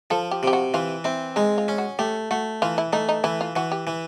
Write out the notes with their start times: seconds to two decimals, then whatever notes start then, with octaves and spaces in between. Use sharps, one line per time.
0.11 F3 A4
0.31 G4
0.43 C3 G4
0.53 F#4
0.74 E3 F4
1.04 C4 E4
1.36 G#3 D#4
1.58 F4
1.68 C#4
1.78 F#4
1.99 A3 G4
2.31 A3 F#4
2.62 E3 F4
2.78 E4
2.93 A3 D#4
3.09 D#4
3.24 E3 E4
3.41 F4
3.56 E3 F#4
3.72 G4
3.87 E3